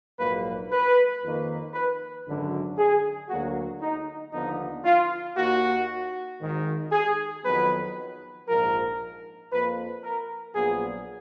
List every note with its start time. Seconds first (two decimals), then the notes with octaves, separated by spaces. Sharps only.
0.19 A#1 G#2 F#3 A#3 B4
0.71 B4
1.23 F2 D#3 A#3
1.74 B4
2.25 G#1 F#2 D3 F#3
2.78 G#4
3.29 D2 D3 F#3 A#3 F#4
3.81 D#4
4.33 D#2 D3 F3 B3 D#4
4.85 F4
5.37 D#2 D#3 A#3 F#4
6.40 G#1 G#2 D#3
6.92 G#4
7.44 F2 D#3 F#3 B3 B4
8.47 A#1 G#2 F3 A#4
9.51 F2 F3 A#3 B4
10.03 A#4
10.54 A#1 A#2 F#3 B3 G#4